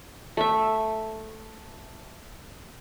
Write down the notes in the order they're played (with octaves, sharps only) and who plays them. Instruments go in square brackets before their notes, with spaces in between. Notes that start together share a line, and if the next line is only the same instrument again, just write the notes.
[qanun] A3 E5